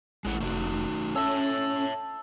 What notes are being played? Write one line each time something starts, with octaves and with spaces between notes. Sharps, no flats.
A1 G#3 E4 F#5
F1 A3 D#4 F#4
C#4 A4 C#5 E5